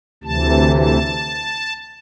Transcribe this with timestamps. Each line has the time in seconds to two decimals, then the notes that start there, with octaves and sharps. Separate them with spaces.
0.24 D2 C3 E3 A5
0.77 A5